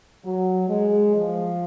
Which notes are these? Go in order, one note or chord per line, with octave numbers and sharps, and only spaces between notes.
F#3
G#3
F3